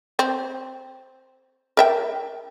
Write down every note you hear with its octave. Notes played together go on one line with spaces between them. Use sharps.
C4
A#4 E5 G5